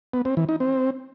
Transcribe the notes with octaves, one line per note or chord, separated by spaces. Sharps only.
B3
C4
E3
D#4
C4